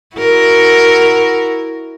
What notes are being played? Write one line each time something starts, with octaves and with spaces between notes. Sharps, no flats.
E4 F#4 A#4